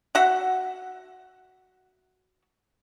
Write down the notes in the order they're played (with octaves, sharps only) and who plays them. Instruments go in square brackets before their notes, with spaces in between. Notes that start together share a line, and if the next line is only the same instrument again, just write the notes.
[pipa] F#4 E5 F#5